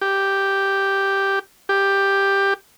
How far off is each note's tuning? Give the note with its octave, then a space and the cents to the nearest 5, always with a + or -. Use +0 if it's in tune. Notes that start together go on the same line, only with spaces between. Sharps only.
G4 +0
G4 +10